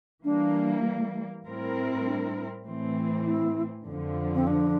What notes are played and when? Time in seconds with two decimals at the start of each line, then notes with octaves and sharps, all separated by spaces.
0.24 E3 G3 A#3 D4
1.45 A2 G3 C4 E4 A#4
2.05 D4
2.65 A2 E3 A3 C4
3.26 E4
3.86 F2 D3 F3
4.35 C4
4.47 D4